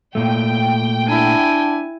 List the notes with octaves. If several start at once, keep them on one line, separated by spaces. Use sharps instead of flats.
A#2 A3 G5
D4 E4 G#5